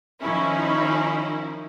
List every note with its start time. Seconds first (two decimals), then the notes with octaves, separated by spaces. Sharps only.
0.21 D#3 F3 C#4 D#4 E4